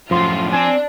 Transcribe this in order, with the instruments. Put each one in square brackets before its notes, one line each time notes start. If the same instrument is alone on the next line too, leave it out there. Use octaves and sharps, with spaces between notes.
[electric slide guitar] F#2 A2 [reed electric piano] F3 C6 [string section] F4
[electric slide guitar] C4 C5 [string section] D4 [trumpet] G#5